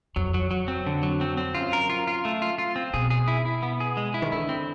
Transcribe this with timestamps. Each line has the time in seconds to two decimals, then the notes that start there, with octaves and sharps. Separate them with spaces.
0.16 F2 F#3
0.34 F#3
0.51 F#3
0.68 C4
0.86 D3
1.03 F#3
1.21 C4
1.37 C4
1.55 F#2 F4
1.73 A#4
1.90 F4
2.07 F4
2.25 A3
2.42 F4
2.58 F4
2.76 C4
2.94 B2 G#4
3.10 G#4
3.28 E4
3.45 E4
3.63 B3
3.80 G#4
3.97 G#3
4.14 E4
4.22 D#3
4.32 D3 E4
4.49 C4